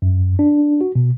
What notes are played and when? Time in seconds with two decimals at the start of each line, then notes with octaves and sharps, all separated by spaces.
0.02 F#2
0.39 D4
0.81 F#4
0.95 B2